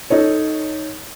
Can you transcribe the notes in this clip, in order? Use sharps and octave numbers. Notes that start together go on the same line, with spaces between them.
D#4 A4 C#5